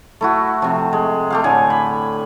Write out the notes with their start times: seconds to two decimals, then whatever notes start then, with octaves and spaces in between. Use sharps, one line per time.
0.21 A3 E4 F#4
0.62 C3 F3
0.93 G#3
1.30 A3 G4 F5
1.44 A2 D3 G#5
1.70 B5